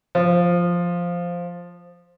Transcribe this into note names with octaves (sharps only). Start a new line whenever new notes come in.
F3